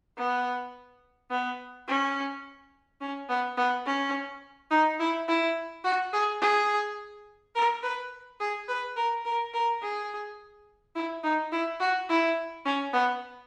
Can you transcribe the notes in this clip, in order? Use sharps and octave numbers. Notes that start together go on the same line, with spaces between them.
B3
B3
C#4
C#4
B3
B3
C#4
D#4
E4
E4
F#4
G#4
G#4
A#4
B4
G#4
B4
A#4
A#4
A#4
G#4
E4
D#4
E4
F#4
E4
C#4
B3